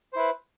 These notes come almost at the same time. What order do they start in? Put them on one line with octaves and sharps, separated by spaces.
C5 E4 B4